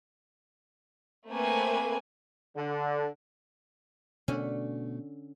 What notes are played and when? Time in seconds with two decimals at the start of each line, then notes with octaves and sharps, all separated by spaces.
1.29 A3 A#3 C4 B4 G#5
2.56 D3
4.28 B2 D3 A3 C#4